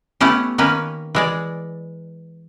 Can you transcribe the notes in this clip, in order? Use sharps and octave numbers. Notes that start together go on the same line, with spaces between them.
A3 B3 C#4 E4 G4
D#3 A#3 C#4 B4
E3 G#3 D5